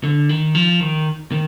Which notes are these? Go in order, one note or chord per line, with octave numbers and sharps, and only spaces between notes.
D3
D#3
F3
D#3
D#3